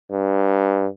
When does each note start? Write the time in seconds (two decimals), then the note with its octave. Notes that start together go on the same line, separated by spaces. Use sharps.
0.11 G2